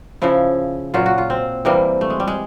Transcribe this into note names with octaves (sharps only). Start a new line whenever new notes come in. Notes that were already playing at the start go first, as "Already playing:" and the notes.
C#3 F3 E4
A#2 F#3 F4
F#4
F4
C4
C3 E3 G3 A#3
A3
G#3
G3
G#3